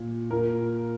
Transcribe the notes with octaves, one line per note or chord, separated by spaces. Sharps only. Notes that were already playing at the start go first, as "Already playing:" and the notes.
Already playing: A#2
A#2 A#4